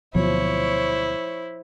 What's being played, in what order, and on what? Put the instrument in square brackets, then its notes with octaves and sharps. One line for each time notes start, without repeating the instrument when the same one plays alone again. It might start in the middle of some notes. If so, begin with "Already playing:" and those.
[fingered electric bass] D2 B2 F#3 [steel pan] F3 [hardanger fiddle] E4 C5 [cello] C#5